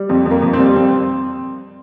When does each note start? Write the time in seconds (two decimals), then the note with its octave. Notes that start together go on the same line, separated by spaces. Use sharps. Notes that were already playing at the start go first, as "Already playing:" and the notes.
Already playing: G3
0.09 F2 C4
0.26 F2
0.31 A#3
0.42 F2
0.53 C4
0.59 G3
0.76 F2 C4